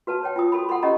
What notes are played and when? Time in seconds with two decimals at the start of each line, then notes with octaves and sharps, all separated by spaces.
0.07 F#4 B4 A5
0.23 C#5 G5
0.36 F4 G5 D#6
0.52 F#4 A4 B5
0.69 A4 F#5 G#5 B5 C6
0.82 C#4 G4 D#5 F#5 A#5